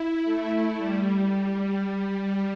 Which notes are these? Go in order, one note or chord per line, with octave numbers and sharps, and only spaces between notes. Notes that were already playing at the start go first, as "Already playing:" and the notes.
Already playing: E4
A3
G3